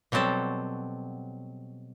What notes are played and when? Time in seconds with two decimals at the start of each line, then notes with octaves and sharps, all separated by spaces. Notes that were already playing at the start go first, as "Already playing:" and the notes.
0.12 B2 F#3 G3 C4 A4